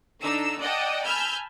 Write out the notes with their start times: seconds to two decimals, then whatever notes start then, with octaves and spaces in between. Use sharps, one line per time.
0.22 D3 D4 D#4 E6
0.59 D5 D#5 F#5 G5 A5
1.05 G#5 A5 B5 E6 F6 G6